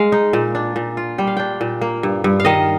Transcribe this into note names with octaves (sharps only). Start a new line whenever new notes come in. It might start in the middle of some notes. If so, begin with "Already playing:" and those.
Already playing: G#3 F5
D#4
A#2
D4
A#2
F4
G3 G5
F5
D4 G5
A#2
A#3
G2
G2
F5
D#3 D#5